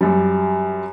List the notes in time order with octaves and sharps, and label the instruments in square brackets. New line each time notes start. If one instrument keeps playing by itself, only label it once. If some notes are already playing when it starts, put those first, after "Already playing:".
[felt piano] F#2 G3